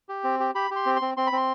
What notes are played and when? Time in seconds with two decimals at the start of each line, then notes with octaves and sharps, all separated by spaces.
0.09 G4
0.24 C4
0.40 G4
0.55 G4 B5
0.71 G4
0.76 C6
0.86 C4
0.96 C6
1.02 C4
1.17 C4 C6
1.27 B5
1.32 C4 C6